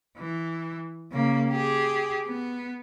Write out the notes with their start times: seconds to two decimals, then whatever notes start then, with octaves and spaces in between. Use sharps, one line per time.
0.18 E3
1.12 C#3 A#3
1.51 G4 G#4
2.26 B3